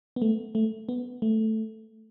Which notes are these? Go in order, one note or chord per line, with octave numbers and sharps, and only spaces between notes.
B3
A3
A3
B3
A3